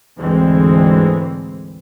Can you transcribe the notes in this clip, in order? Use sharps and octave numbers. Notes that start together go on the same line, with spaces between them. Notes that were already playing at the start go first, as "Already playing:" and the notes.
D2 G#2 E3 G#3 C4